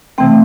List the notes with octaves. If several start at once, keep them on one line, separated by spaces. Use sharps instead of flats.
C3 E3 A3 C4 G5